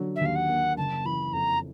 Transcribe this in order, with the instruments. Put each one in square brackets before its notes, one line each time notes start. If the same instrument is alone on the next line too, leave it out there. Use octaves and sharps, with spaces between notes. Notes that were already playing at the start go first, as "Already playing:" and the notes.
Already playing: [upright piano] D3 F#3
[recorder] E5
[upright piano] D#2 [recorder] F5
[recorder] F#5
[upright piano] A#3
[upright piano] F#1 [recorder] A5
[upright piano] E3 [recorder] B5
[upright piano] F2 [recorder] A#5